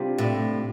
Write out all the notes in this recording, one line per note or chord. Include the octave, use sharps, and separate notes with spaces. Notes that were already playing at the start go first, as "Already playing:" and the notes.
Already playing: C3 G3 D4 F4
A2